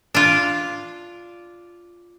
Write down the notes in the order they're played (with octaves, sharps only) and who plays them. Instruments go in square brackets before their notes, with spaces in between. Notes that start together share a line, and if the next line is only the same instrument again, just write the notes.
[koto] D4 F4